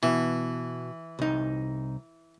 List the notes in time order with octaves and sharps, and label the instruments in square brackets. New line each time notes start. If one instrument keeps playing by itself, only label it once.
[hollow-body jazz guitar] B2 [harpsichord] E3
[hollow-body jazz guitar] C2 D#4